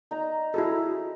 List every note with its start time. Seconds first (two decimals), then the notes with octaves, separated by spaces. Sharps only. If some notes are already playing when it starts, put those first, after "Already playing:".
0.11 D#4 A#5
0.54 E4 F#4 G#4 A4